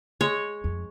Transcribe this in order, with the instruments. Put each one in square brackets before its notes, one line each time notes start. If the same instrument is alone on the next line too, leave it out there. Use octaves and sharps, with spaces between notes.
[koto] G#3 [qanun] C#5
[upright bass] F2